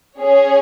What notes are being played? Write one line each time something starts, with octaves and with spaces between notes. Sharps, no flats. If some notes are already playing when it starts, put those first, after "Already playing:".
C#4 G#4 C#5